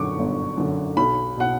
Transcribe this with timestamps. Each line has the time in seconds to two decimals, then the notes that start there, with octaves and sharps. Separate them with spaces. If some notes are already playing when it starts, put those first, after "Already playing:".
Already playing: F#2 D3 C#6 D6
0.19 G1
0.57 F#2 D3
0.97 B1 B5
1.37 B2 F#5